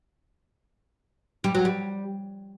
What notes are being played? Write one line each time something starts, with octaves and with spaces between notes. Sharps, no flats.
G3
F#3
G3